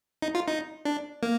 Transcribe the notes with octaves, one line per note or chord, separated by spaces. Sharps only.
D#4
F4
D#4
D4
A#3